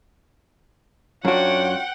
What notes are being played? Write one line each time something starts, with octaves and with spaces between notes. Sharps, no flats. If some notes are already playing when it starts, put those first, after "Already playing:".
F#2 D4 F4 F#4 C#5 F#5 G5